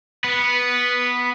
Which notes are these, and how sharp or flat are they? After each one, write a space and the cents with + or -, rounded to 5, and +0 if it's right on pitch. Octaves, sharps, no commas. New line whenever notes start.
B3 +0 B4 -10